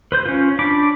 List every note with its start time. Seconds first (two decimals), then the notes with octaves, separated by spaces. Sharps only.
0.12 B4 C5 G6
0.26 C#4 F4
0.59 D4 B5 D6